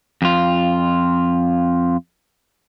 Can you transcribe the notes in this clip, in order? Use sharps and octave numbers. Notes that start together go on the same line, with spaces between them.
F2 F4